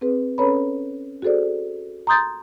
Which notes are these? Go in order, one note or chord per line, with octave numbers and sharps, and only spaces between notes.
C4 G#4 B4
C#4 A4 B4 C#5 A#5 B5
F#4 G#4 A4 C5 D5
A#5 C6 D#6 G6 A6